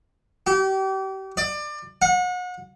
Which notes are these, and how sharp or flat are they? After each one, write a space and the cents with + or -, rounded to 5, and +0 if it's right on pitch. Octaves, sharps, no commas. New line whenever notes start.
G4 -35
D5 +25
F#5 -35